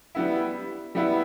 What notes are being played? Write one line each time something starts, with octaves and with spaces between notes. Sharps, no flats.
G3 B3 E4
G3 B3 E4